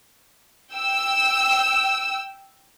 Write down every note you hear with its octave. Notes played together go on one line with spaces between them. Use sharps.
G5 E6